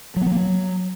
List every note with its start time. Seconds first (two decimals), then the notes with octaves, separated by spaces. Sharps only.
0.16 F#3
0.21 B3
0.26 F#3
0.31 A#3
0.37 F#3